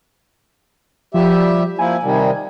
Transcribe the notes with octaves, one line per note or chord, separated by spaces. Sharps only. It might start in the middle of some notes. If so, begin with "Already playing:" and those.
F3 G3 G4 E5
F3 A#3 E4 G#5
C3 D#3 G3